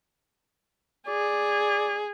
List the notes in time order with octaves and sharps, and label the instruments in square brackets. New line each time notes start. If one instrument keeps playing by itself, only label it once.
[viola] G#4 [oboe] D5